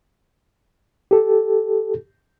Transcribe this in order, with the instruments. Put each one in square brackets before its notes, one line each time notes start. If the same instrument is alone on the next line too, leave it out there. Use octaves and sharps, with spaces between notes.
[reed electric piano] G4 A4